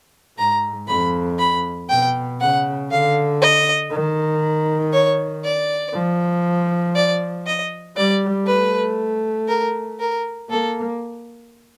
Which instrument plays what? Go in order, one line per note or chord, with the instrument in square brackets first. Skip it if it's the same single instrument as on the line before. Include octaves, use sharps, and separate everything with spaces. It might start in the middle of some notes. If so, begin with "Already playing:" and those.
[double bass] G#2 [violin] A#5
[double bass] F2 [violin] B5
[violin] B5
[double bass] B2 [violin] G5
[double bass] C#3 [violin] F#5
[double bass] D3 [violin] F5
[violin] D#5
[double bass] D#3
[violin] C#5
D5
[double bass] F3
[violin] D5
D#5
[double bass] G3 [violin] D5
[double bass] A3 [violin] B4
[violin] A#4
A#4
[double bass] A#3 [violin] A4